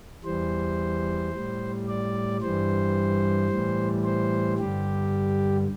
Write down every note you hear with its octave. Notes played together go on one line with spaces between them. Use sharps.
E2 E3 G3 C5
A2 G3
D5
G2 E3 G3 C5
A2 E3 G3
C5
G2 D3 G3 G4